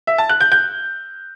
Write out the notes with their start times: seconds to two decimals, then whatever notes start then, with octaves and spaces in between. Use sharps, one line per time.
0.07 E5
0.18 A5
0.29 F#6
0.41 G6
0.52 G6